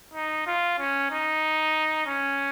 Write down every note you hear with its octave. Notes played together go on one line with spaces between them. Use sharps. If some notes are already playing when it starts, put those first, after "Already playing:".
D#4
F4
C#4
D#4
C#4